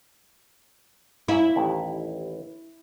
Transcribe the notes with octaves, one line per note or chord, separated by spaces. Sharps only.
A#3 C#4 E4
A1 D#2 A5